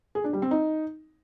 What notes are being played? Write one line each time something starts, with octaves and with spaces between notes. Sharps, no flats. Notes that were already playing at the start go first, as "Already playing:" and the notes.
G#4
D4
G3
C4
D#4